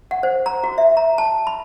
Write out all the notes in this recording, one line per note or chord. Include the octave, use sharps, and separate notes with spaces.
F#5
C5
A#5
F#4
E5
A#5
A5
B5